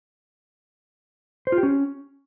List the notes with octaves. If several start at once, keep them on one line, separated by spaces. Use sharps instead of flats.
C5
F4
G4
C#4